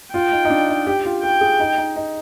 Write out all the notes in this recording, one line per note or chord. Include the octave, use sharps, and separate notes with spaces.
F4 G5
D#4
D#4
D4
D#4
G4
F4
G4 G5
G#4
D#4
D#4
D#4